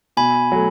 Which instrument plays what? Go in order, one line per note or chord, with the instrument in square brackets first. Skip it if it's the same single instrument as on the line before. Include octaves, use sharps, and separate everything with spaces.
[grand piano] B2 [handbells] G#5 B5
[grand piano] F#3 A3